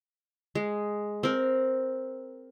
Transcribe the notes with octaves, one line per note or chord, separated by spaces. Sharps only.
G#3
C4 A#4